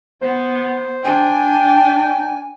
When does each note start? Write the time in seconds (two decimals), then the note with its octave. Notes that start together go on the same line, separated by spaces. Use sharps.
0.22 B3 C5
1.05 D4 G5 G#5